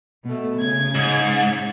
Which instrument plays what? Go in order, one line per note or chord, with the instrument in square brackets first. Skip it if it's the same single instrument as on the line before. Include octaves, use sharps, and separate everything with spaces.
[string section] B2 A3
C#3 G#6
[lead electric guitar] G#2